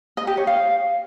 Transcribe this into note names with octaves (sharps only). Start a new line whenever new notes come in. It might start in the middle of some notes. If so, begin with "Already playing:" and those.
D#5
G4
C#5
F5